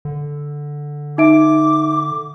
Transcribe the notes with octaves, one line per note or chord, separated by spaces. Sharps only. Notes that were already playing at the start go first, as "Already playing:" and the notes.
D3
D#4 E5 D6 D7